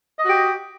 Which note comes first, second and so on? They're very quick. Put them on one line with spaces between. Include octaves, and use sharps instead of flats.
D#5 F#4 G4